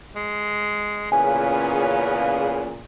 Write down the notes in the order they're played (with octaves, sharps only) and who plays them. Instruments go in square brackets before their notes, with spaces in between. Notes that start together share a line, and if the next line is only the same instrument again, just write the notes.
[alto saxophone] G#3
[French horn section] A#2 C#3 [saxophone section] E3 B3 G#4 [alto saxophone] C#4 [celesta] G#5